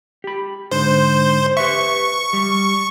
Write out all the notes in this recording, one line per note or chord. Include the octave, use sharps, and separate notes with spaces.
G4 B5
G#2 D3 C5
G4 B4 E5 C#6
G3